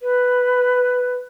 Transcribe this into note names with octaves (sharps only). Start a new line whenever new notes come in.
B4